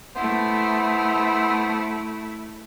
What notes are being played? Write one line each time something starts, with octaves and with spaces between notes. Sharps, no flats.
A3 B3 E4 C5